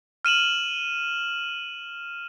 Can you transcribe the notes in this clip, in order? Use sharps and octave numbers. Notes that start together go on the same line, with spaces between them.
F6 D#7 E7 F#7